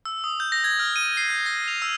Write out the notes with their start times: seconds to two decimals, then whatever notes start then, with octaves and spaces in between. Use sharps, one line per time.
0.05 E6
0.24 D#6
0.40 G6
0.52 A#6
0.64 G#6
0.79 F6
0.96 D#7
1.17 C7
1.30 G6
1.46 A#6
1.68 F7
1.82 E6